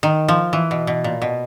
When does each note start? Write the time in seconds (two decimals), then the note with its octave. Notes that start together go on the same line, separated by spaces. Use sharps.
0.03 D#3
0.28 F3
0.53 E3
0.71 B2
0.87 B2
1.04 A#2
1.22 B2